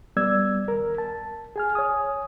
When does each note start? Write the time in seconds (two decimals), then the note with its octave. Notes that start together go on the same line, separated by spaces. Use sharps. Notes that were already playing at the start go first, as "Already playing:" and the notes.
0.16 G3 B3 D5 E6 G#6
0.68 D#2 A#4
0.98 A5
1.56 G#4 G#5 F6
1.75 C#5 G#5 D#6